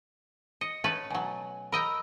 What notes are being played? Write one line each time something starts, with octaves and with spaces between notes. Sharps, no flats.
D#5 C#7
A3 C#4 B4 A6
B2 F#3 G#5
A#4 D#5 G5 B5 E6